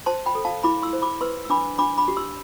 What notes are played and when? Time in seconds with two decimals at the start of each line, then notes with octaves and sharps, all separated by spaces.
0.06 C5 A5 C6
0.26 G5 B5
0.35 A4
0.45 F5 A5
0.64 E4 B5 D6
0.83 C6 E6
0.93 C5
1.02 B5 D6
1.21 B4 C6 E6
1.45 E6
1.50 D4 B5 D6
1.78 D4 B5 D6
1.98 B5 D6
2.08 G4
2.17 C6 E6